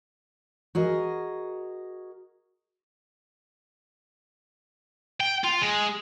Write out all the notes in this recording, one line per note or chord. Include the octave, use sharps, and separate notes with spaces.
F#4 G#4 A#4 D#5
G5
F4
G#3